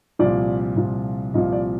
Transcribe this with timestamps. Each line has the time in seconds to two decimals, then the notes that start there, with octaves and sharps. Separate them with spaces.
0.19 C2 A#2 F3 D5
0.76 C2 A#2 F3
1.34 C2 A#2 F3 D#5
1.53 D5